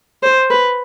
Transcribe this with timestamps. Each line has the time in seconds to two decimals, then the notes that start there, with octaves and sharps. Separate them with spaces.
0.23 C5
0.50 B4